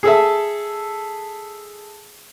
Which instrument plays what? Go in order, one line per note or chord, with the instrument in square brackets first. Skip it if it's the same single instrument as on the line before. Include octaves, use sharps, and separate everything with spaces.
[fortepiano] G#4 A4 E5